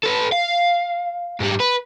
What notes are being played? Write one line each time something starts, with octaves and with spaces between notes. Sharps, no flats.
A4 B4
F5
G#2 G3
B4